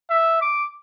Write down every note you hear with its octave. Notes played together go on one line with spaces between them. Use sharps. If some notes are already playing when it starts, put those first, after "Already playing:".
E5
D6